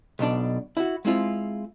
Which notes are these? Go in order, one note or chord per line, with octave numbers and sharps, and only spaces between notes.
B1 B2 D4 D5
E4 F#4
G#3 C4 E4 F4